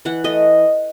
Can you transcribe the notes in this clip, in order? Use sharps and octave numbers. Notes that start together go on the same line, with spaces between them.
E3 F#5
A3 D#5